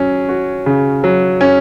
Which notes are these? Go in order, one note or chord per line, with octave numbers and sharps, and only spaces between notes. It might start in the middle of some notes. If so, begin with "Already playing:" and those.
Already playing: F#3 C#4
F#4
C#3
F#3
C#4